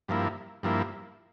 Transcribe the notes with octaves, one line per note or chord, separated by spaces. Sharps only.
G2 F3 A#3 E4
G2 F3 A#3 E4